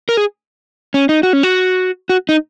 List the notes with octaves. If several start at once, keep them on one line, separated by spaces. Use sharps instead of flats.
A#4
G#4
C#4
D#4
F#4
C#4
F#4
F#4
D#4